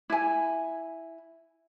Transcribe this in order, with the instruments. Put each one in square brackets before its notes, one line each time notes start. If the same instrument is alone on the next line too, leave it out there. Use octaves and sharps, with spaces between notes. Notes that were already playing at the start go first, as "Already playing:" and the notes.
[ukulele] E4 G#5